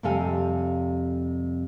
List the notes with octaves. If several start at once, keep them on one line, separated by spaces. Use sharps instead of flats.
F2 C3 G3 A4 F5 G#5